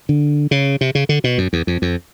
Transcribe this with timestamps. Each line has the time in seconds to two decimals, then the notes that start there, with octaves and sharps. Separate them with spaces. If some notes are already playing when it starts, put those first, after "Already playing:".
0.09 D3
0.51 C#3
0.81 C3
0.95 C#3
1.09 D3
1.24 B2
1.38 F#2
1.53 E2
1.67 F2
1.82 F2